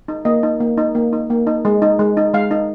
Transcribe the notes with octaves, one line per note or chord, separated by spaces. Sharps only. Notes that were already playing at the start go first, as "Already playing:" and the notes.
D#4
A#3 D#5
D#4
A#3
D#4
A#3
D#4
A#3
D#4
G#3
D#4
G#3
D#4
G#3 F5
D#4